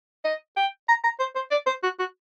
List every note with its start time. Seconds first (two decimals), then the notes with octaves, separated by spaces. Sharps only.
0.25 D#5
0.57 G5
0.89 A#5
1.04 A#5
1.19 C5
1.35 C5
1.51 D5
1.67 C5
1.83 F#4
1.99 F#4